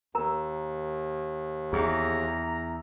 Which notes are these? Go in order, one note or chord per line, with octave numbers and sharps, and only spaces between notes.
D#2 A#4 A#5
E2 G#4 A#5